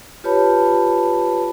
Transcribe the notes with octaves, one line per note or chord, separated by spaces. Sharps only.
F4 G4 B4 C#5 A5 B5